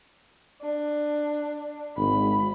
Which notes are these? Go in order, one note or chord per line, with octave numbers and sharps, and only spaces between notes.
D4
G#1 B5